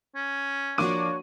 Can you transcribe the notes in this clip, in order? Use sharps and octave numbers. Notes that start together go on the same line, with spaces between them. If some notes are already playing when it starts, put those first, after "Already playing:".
C#4
F3 A#3 D4 F#4 C#5 D6 D#7